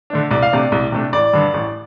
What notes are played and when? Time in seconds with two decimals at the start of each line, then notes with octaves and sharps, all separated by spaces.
0.10 D3 A3 D4
0.31 C2 D5
0.42 F5
0.51 C3 A3 D4 D5
0.72 C2
0.92 C3 A3 D4
1.13 A1 D5
1.33 G2 D3
1.54 A1